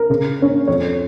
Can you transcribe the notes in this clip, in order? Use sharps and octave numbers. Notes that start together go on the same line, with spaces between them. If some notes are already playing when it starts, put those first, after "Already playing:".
Already playing: A#4
C#3
A#3 C#4
F2 C#5